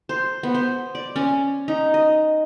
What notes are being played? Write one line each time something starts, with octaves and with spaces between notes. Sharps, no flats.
C5
B3
C5
D5
C#4
D#4
D#5